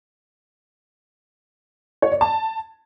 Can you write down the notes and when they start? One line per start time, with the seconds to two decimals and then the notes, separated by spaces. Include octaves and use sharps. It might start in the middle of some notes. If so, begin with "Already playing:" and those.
2.02 C#5
2.12 D5
2.21 A5